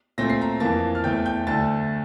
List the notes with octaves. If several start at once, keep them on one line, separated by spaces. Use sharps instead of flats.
A#2 A3 C4 A#6
C7
A#5 A#6
F2 E3 A#3 A5 A6
F6
E2 E3 A3 G5 G6
G5 G6
D2 D3 A3 A5 A6